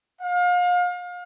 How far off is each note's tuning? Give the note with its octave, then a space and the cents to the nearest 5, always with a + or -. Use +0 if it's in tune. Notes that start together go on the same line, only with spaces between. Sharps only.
F5 +35